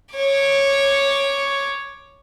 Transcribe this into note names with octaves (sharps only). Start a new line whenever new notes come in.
C#5 D6